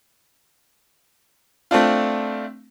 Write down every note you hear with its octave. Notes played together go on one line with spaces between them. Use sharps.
A3 C4 D4 F4